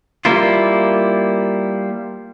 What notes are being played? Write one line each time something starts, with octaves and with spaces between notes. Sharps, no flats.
G3 A#3 E4 F4